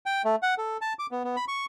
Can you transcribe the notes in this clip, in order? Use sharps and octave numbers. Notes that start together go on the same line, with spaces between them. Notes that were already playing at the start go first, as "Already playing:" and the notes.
G5
A3
F#5
A4
A5
D6
B3
B3
B5
C#6